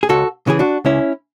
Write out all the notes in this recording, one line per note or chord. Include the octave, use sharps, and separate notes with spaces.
G#4
C#2 F#4 A4
C#3 E3 G#4
D4 F#4
C#2 C#4 E4